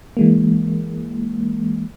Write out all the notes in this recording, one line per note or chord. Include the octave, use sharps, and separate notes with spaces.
E3 G#3 A#3